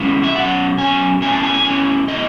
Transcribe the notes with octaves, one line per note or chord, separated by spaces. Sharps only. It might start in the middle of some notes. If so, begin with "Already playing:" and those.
Already playing: B2 G#3 C#4 E4
E5
B2 F#3 C#4 F#5
B2 F#3 C#4 G#5
B2 A3 C#4 E4 G#5
A5
G#5
G#5
B2 A3 C#4 E4
B2 A3 E4 D#5